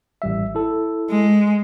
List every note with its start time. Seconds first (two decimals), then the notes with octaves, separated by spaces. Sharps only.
0.22 A1 G3 E5
0.55 E4 A4
1.11 G#3